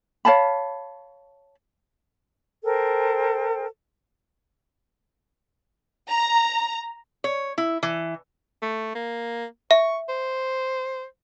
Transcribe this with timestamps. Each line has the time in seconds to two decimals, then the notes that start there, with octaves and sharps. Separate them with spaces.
0.25 C#5 F5 A5 B5
2.64 A4 A#4 C5 G5
6.10 A#5
7.24 C#5
7.58 E4
7.83 E3
8.62 A3
8.95 A#3
9.71 E5 C#6
10.09 C5